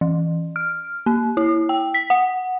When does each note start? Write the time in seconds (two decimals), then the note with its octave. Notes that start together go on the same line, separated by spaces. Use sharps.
0.01 E3
0.56 F6
1.06 A#3
1.37 E4
1.69 G5
1.94 B6
2.10 F#5